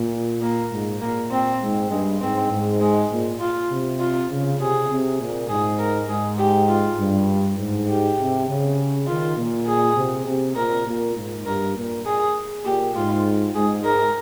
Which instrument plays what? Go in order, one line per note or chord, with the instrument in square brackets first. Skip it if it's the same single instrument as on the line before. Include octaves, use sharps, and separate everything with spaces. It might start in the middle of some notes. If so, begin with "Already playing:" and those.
Already playing: [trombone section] A#2
[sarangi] A#3
[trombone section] G#2
[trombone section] A#2 [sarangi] A#3
[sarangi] C4
[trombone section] G#2
[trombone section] G2 [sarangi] G#3
[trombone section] G#2 [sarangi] C4
[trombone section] G#2
[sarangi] G#3
[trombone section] A#2
[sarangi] F4
[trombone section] C3
[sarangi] F4
[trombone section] C#3
[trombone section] C3 [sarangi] G#4
[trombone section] C3
A#2
[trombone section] G#2 [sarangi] G#4
[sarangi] A#4
[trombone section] G#2 [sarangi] G#4
[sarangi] G4
F4
[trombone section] G2
G#2
[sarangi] G4
[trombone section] C3
C#3
[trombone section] D#3 [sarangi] F4
[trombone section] A#2
[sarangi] G#4
[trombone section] C3
C3
[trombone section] A#2 [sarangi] A#4
[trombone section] A#2
G#2
[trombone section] G2 [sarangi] A#4
[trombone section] A#2
[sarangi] G#4
[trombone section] A#2 [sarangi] G4
[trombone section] G#2 [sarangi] F4
[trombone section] G#2 [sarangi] G#4
[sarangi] A#4